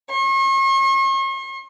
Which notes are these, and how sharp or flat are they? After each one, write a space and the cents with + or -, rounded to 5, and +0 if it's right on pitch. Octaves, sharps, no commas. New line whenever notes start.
C#6 -45